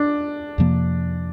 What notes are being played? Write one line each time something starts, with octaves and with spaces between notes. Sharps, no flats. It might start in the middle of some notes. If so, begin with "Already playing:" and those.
Already playing: D4
F2 C3 F3 A#3